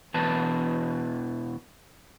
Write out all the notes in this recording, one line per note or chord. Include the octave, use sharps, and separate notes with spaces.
E2 B2 E3 B4 A5